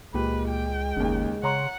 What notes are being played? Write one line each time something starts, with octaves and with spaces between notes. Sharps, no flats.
C#2 A#2 G#3 G4 B4
G5
G1 D#2 C#3
C#3 C#5 F#5 A#5 C6